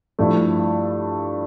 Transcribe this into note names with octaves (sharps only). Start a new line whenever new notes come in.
G2 F3 A3 E4